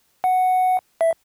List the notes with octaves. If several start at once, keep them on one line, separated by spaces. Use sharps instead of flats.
F#5
E5